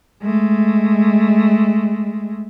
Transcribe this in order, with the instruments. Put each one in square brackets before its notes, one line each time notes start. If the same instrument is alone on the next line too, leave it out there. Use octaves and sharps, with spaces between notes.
[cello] G#3 A3